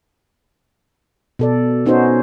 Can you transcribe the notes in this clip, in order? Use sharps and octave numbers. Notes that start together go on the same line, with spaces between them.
B2 A4 D5
B3 C#4 D#4 F#4 C5